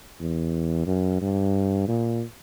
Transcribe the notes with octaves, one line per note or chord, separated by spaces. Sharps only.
E2
F#2
G2
A#2